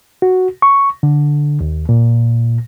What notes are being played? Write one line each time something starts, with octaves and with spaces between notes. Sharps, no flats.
F#4
C#6
D3
D#2
A#2